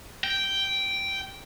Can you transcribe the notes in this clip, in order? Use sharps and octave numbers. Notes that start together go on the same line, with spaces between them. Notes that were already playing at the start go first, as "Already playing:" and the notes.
G5